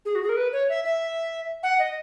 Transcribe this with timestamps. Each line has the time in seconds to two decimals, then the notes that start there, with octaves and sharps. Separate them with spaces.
0.05 G#4
0.15 F#4
0.23 G#4
0.29 A#4
0.37 B4
0.52 C#5
0.69 E5
0.85 E5
1.63 F#5
1.79 D#5